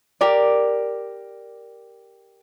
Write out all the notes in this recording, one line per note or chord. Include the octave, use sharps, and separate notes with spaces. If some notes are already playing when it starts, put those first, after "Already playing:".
G4 A#4 D5